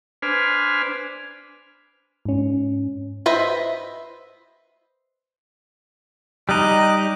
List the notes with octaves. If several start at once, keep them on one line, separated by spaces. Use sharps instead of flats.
D4 B4 C5 G#5 F6
G#2 C#4
B4 C5 D#5 E5
G3 D#4 D#5 D6 F#6